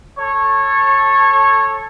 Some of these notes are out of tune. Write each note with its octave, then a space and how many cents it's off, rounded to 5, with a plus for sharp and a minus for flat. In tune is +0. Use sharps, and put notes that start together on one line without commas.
A4 +0 C#5 -15